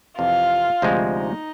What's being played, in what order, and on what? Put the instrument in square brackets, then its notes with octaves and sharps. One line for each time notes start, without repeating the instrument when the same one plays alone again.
[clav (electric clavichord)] F2 C3 E3 [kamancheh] F4
[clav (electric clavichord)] D2 C3 F3 G#3
[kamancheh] D#4